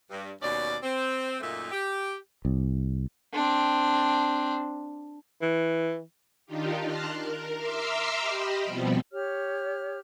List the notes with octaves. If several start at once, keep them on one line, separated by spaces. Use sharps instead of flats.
G2
D#2 B2 C#4 D5
C4
F#2 A#2 A3 A#3 D#4 E5
G4
C2
C4 D4
E3
D#3 D4 D#4 F4 G4
A5 A#5 C6 F6 F#6
A#4
E5 A#5 C6 D6 E6 F6
G4 D#5 B5
B2 F3 G3 B3 C4
G4 C#5 F6